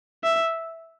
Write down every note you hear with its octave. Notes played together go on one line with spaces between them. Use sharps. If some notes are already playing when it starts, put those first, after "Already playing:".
E5